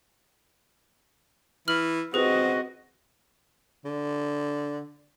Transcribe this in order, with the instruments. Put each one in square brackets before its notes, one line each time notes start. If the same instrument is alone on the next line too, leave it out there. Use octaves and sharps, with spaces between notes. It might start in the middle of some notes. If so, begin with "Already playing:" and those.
[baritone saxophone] E3 [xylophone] F6 F#7
[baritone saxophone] C4 [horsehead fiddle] F#4 D#5 [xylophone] G#4 B4
[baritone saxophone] D3